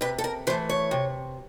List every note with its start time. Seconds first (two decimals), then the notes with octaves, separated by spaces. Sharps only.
0.01 C3 B4
0.18 A4
0.24 A#4
0.47 E3 A3 C5
0.69 C#5
0.91 C3